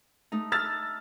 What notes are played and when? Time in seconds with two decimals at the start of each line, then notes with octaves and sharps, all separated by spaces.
0.32 A3 D#4
0.52 E6 F6 A6